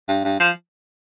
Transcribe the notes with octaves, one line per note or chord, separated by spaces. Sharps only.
G2
G2
F3